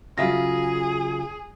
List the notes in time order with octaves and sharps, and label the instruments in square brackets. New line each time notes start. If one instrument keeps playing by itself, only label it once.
[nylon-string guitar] C#3 F4 E5 [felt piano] F#3 A#6 [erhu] G#4